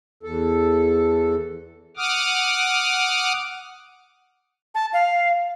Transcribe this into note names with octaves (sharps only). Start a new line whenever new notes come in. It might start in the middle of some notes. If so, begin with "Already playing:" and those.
E2 A4
F#5 D6 D#6 F6
A5
F5